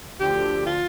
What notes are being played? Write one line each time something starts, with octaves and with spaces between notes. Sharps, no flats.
D2 D3 F3 G4
F4